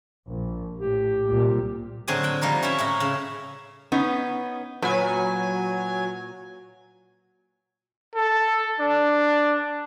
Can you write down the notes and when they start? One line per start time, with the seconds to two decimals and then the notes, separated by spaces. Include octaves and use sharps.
0.28 A#1
0.78 A2 G4
1.27 C2 A#2 G3
2.08 A2 D3 F#3 C4 G#4 G#5
2.23 F#5 G5
2.41 F3 G3 D#4 A#4
2.62 C#4 E4 C#5 E5
2.78 A2 C#4 E4 A#5
3.00 C#3
3.92 B3 C#4 D#4
4.82 A#2 F#3 B4 G#5
8.15 A4
8.80 D4